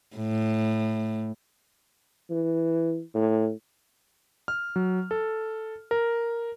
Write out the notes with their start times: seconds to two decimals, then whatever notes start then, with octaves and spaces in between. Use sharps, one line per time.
0.16 A2
2.30 E3
3.14 A2
4.48 F6
4.76 F#3
5.11 A4
5.91 A#4